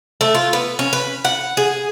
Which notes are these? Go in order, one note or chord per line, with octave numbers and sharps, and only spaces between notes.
A3
F4
B3
C#4
B4
F#5
G#4